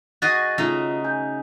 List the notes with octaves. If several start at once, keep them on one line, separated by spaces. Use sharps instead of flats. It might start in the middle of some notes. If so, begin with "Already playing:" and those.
F#4 G#4 D#5 A6
C#3 A3 D#4 F4
G#5 G6